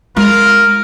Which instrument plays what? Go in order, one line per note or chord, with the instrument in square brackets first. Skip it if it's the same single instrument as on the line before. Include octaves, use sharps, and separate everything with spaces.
[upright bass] G#3 [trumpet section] F4 A#4